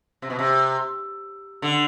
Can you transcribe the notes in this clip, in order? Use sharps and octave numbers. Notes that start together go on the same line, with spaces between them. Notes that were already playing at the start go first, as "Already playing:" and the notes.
C3
B2
C3
D3